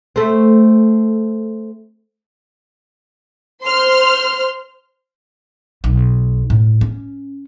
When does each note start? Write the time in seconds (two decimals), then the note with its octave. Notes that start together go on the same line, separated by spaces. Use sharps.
0.16 A3 C4
3.62 C5 C6 F6
5.84 B1
6.50 A2
6.81 C#4